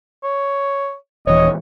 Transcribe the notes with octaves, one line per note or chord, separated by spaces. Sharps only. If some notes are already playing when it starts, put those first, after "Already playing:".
C#5
D#1 E3 C#5 D#5